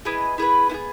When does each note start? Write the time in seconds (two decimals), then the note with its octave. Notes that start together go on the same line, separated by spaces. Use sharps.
0.05 E4 G#4 B4 D#5
0.38 E4 G#4 B4
0.69 B3 E4
0.74 G#4